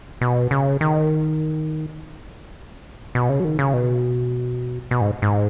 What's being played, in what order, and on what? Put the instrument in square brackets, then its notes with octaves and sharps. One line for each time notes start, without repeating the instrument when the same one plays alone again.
[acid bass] B2
C#3
D#3
B2
C#3
F#3
D#3
C#3
B2
B2
G#2
G#2